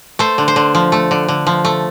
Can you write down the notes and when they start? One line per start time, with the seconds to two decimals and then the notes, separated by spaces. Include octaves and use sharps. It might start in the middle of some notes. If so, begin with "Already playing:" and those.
0.19 A3 C5
0.38 D3
0.48 C5
0.56 D3
0.75 F3
0.92 A3
1.11 D3
1.28 D3
1.47 F3
1.65 A3